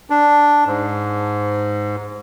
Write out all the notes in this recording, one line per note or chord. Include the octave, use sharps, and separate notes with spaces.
D4
G#2